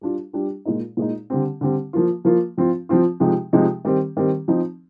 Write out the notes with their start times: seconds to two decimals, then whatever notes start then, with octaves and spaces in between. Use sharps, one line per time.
0.01 G3 D4 F4
0.33 G3 D4 F4
0.65 A#2 G#3 D#4
0.97 A#2 G#3 D#4
1.30 D3 G3 C4
1.61 D3 G3 C4
1.93 F3 A#3 F4
2.25 F3 A#3 F4
2.58 F3 C4 F4
2.89 F3 C4 F4
3.20 C3 F3 G#3 D#4
3.53 C3 F3 G#3 D#4
3.85 D#3 G3 C4
4.17 D#3 G3 C4
4.48 F3 C4 D#4